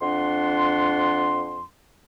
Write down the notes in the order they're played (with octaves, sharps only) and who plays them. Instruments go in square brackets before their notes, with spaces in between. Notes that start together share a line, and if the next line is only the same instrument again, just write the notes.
[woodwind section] F2 D4 F#5 C6